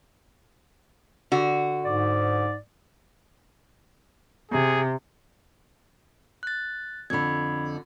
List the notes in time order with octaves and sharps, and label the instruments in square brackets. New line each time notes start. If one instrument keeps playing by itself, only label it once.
[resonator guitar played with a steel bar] D3 F#4
[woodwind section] G#2 D5
[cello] C3 [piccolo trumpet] G#4
[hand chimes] F#6 A6
[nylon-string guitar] F2 D3 [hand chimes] B5 G#6